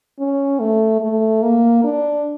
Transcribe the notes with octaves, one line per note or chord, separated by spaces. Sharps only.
C#4
A3
A3
A#3
D4